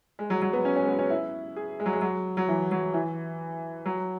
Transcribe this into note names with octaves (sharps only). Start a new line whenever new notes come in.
G#3
F#3
F#3
B3
C#4
C#4
G#3
B3
C#4
E4
G#4
G#3
F#3
G#3
F#3
F#3
E3
F#3
E3
F#3